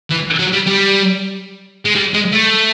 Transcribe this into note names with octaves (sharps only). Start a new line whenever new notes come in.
E3
F#3
G3
G3
G#3
G3
G#3
A3